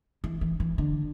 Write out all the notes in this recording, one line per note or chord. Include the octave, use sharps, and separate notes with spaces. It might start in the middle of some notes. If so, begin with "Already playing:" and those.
E3
E3
E3
D3